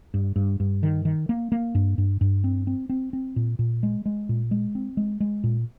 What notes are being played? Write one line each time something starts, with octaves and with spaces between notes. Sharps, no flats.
G2
G2
G2
D#3
D#3
A#3
A#3
G2
G2
G2
C4
C4
C4
C4
A#2
A#2
G#3
G#3
A#2
G#3
C4
G#3
G#3
A#2